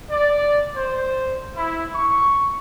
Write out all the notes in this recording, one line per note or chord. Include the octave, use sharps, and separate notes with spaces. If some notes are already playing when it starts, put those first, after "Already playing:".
D5
C5
E4
C#6